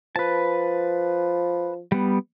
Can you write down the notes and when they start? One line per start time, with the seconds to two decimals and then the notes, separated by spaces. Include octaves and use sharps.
0.16 F3 B4 A5
1.92 G3 B3